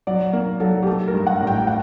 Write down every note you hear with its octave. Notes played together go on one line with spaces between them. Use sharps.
F#3 D5
A#3
F#3 A4
G4
A3 A4
A#4
G2
F#5
A1
G5
F#5